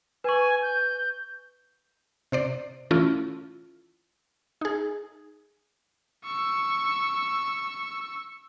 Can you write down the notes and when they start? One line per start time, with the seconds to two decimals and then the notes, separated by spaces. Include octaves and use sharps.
0.24 B4 G#5 C#6
0.62 G6
2.32 C3 C5 D5
2.91 E3 A3 C#4 E4 F4
4.61 D#4 G#4
6.25 C#6 E6